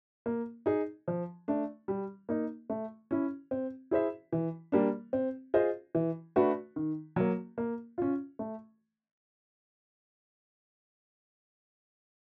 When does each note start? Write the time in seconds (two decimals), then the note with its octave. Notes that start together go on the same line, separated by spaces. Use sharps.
0.26 A#3
0.66 D#4 G#4
1.08 F3
1.48 A3 D4
1.88 G3
2.29 A#3 D#4
2.70 A3
3.11 C#4 E4
3.51 C4
3.91 E4 G#4 C5 E5
4.33 E3
4.72 G3 A#3 D4
5.13 C4
5.54 F4 G#4 C5 D#5
5.95 E3
6.36 A3 D4 F#4 B4
6.76 D#3
7.16 F#3 A#3
7.58 A#3
7.98 C#4 F4
8.39 A3